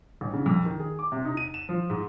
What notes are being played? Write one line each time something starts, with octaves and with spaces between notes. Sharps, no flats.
A1
C#3
F2
D#3
G#4
D6
C3
D#4
D#7
E7
F3
G#2